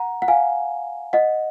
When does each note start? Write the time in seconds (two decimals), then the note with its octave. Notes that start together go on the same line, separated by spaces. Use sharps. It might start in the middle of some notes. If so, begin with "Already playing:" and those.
Already playing: F#5 A#5
0.22 F#5
0.28 F5 G#5
1.13 D#5 F#5